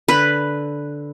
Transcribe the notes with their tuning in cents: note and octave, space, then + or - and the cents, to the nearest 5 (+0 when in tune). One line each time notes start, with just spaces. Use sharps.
D3 -5 B4 +0